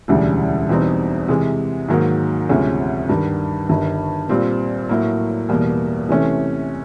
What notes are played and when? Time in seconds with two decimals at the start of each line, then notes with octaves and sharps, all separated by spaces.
0.08 E1 D2 C#3 E3 G3
0.69 E2 B2 G3 C4 D#4
1.28 C3 E3 G#3
1.88 G#2 D#3 F#3 A#3
2.49 D2 C3 F3 G#3 C#4
3.09 G2 D#3 G3
3.69 G1 G2 D#3
4.29 A#2 G3 C4 F4
4.89 A2 F#3 A#3
5.49 E2 B2 G3 A#3
6.09 C3 E3 A3 C#4